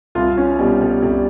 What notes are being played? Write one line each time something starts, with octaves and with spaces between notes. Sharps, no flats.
C2 F4
C#4
B2 G3
G3
C2 G3